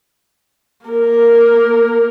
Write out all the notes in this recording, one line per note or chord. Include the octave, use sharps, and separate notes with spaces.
A#3 A#4